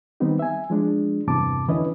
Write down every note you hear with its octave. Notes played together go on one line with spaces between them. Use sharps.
D#3 G3 B3 C4 D#4
E5 G#5
F3 G#3 D4
E2 G2 C3 A5 D6
D3 E3 C#4 E4 B4 D#5